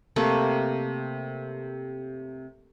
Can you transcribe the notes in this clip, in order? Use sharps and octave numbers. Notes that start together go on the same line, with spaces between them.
C3 A3 A#3